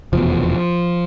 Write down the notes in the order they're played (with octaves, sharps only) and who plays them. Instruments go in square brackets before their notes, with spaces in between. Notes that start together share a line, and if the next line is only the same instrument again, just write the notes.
[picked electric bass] F1 E2 B2 F3